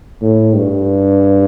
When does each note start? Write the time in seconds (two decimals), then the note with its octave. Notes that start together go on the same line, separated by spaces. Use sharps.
0.22 A2
0.55 G2